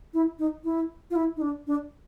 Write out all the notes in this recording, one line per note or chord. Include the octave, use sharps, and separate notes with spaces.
E4
D#4
E4
F4
E4
D#4
D4
D4